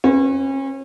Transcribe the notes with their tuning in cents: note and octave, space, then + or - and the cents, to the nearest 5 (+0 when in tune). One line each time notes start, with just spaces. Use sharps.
C#4 -35 B4 +20